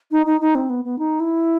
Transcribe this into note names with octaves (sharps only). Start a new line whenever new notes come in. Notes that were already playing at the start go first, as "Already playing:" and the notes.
D#4
D#4
D#4
C4
B3
B3
D#4
E4